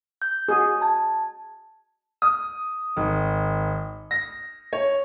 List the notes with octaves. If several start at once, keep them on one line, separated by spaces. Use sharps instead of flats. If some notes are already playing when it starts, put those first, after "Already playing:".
G6
F#4 G#4
A5 G#6
D#6
G#1
A#6
C#5